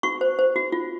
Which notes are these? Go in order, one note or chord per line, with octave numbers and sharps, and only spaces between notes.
F#4 C#6
C5
C5
F#4
F4